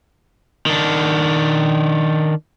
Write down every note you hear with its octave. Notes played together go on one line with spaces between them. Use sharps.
D#3 D4